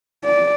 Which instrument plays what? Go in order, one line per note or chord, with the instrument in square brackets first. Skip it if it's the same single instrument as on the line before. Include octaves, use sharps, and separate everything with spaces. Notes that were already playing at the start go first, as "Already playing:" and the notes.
[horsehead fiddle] D5